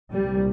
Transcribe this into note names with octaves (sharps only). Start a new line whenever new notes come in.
C2 A#2 G3